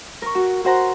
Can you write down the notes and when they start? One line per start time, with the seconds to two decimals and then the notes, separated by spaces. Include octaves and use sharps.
0.22 A#4 C#6
0.35 F#4
0.64 F#4 C5 F#5 A#5 C6